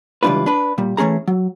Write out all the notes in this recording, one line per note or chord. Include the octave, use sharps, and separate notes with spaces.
C#2 E3 G3 D4 F4 B4
D4 B4
A#2 G3
E3 A3 C#4 G#4 A#5
F#3